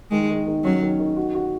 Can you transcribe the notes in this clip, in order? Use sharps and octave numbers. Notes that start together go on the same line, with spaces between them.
D#3 G#3
D#3
D#3
F#3 C#4
D#3
D#3
F#4
F#4